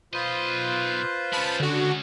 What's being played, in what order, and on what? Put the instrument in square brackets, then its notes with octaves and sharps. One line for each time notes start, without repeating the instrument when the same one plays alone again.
[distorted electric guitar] B1 D#5 [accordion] F4 B4 C5
[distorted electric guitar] G#3 C#4 [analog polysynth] A5 B5
[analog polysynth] D3 F#4